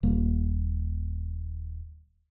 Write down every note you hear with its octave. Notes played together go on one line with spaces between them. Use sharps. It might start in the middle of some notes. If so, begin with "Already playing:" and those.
D#1 A#3